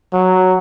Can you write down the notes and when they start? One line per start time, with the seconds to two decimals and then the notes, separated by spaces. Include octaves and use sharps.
0.13 F#3